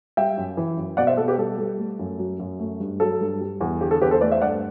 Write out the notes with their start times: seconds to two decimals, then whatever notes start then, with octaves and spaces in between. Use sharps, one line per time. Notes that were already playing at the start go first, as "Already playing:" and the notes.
0.17 G3 E5 G5
0.37 F#2
0.57 E3
0.77 F#2
0.97 B2 D5 F#5
1.07 C5 E5
1.17 B2 A4
1.28 G4 B4
1.37 G3 A4
1.58 G3
1.78 A3
1.99 F#2
2.19 F#3
2.39 F#2
2.59 A3
2.80 G2
3.00 F#3 A4
3.21 G2
3.41 G3
3.61 E2
3.81 D3 G4
3.91 A4
4.02 E2 G4 B4
4.11 A4 C5
4.21 A3 B4 D5
4.32 C5 E5
4.42 G2 D5 F#5